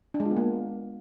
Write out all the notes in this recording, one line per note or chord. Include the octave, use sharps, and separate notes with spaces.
D4
G#3
F4
B3
A#3